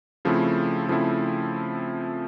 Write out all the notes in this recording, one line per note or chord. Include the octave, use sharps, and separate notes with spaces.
C#3 F3 A3 C4 E4
C#3 F3 A3 C4 E4